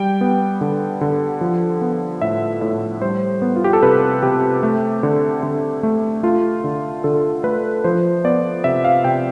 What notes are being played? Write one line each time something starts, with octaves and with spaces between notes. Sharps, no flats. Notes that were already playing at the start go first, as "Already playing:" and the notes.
Already playing: G3 G5
B3
D3
D3
F3
B3
A2 E5
A2 E5
G3 C5
B3
F4
G4
A4
C3 B4
C3 G4
A3
D3
D3
A3
A3 F4
D3
D3 A4
A3 B4
F3 C5
B3 D5
C3 E5
F5
C3 G5